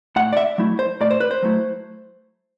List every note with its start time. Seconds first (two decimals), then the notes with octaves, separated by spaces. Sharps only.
0.16 A2 F#5
0.33 D5
0.37 E5
0.58 F#3 A3 E4
0.79 C5
1.01 A2 D5
1.11 C5
1.20 B4
1.31 C5
1.42 F#3 A3 E4